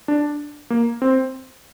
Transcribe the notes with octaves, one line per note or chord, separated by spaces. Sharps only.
D4
A#3
C4